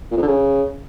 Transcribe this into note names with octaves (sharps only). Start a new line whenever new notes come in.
A#2
F2
D3
C#3